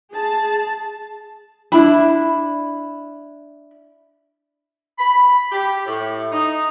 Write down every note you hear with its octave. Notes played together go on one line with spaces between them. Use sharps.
G#4 A5
D4 E4 B5
B5
G4
A2
D#4